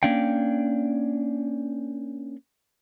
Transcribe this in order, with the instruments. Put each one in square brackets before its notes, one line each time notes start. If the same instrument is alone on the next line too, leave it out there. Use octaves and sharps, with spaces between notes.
[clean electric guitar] A#3 C#4 D4 F5 G5